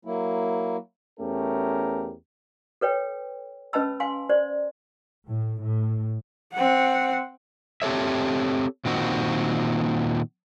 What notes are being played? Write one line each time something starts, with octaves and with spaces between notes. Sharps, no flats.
F#3 A#3 E4
E2 A3 C#4 G4 A#4
A4 B4 C#5 G5
C#4 B4 D#5 A5 B5 E6
F5 G#5 C6
C5 D5
A2
A2
C4 F#5
C4 G4 A4 C#5 E5
A#2 D#3 C4 F#4